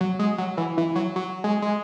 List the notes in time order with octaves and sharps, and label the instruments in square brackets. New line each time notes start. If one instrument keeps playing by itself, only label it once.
[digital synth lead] F#3
G#3
F#3
E3
E3
F#3
F#3
G#3
G#3